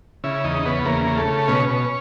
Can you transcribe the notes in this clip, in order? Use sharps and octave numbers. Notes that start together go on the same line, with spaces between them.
C#3 E4
E2 D#4
C#3 B3
E2 A#3
C#3
A3
C#3
B2 C#4
B2